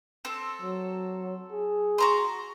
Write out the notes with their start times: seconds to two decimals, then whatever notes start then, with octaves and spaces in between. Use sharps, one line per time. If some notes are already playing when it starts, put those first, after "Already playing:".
0.25 C4 A4
0.61 F#3
1.51 G#4
1.98 F#4 A#5 C6